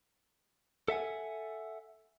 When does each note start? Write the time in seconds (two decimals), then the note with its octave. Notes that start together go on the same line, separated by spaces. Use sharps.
0.88 A4 E5 F#5 G#5